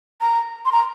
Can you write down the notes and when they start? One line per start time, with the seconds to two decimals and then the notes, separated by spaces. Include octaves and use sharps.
0.21 A#5
0.65 C6
0.72 A#5